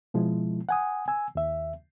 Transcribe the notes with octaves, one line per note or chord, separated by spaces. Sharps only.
B2 F3 G#3 E4
F#5 G#5 D#6
G#5 E6
D#2 E5